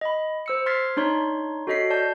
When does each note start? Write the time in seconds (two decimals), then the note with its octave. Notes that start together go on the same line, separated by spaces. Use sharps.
0.01 D#5 B5
0.46 C5 E6 C#7
0.66 C6 F6 G#6 A6 B6 C7
0.97 D4 D#4 C#5 C6
1.67 F#4 A4 C#5 D#5 B6 C7
1.90 D5 A5 G6